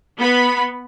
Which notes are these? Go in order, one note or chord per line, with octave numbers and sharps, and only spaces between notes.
B3 B5